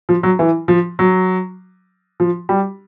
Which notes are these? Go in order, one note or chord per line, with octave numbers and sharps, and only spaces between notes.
F3
F#3
E3
F3
F#3
F3
G3